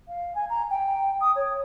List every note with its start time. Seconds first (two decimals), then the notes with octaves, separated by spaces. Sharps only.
0.08 F5
0.35 G#5
0.49 A#5
0.70 G5
1.20 D#6
1.35 C#5